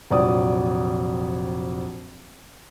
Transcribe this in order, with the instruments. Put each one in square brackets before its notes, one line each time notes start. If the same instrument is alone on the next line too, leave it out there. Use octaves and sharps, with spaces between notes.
[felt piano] F1 A#1 F#3 D5 D#6